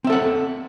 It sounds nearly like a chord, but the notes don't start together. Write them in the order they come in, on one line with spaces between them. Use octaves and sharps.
C4 E5 A4 F#5